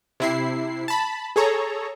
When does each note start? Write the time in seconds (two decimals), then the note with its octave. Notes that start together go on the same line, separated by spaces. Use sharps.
0.20 C3 E4 C7
0.88 A5 B5
1.36 G#4 A4 C#5 A#5